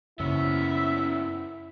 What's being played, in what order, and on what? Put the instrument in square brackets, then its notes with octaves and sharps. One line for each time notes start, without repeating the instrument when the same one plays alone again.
[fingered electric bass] F#2 C#3 A#3 [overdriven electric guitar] B3 C#4 [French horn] E4 [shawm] E5